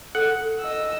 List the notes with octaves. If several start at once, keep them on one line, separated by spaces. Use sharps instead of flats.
A4 F#5
D#5 E6